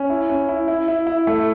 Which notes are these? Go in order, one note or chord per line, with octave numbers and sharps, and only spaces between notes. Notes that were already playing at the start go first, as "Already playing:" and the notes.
Already playing: C#4
E4
C#4
E4
E4
E4
E4
A3